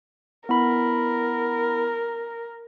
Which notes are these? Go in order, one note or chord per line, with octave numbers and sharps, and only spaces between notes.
B3 E4 A#4 B5